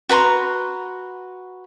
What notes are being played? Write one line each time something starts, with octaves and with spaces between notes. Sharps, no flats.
F#4 B4 A#5 C6